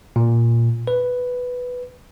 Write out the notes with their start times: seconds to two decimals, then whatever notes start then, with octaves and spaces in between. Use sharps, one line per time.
0.16 A#2
0.87 B4